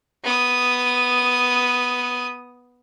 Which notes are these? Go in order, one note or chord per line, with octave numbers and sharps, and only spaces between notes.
B3 D#6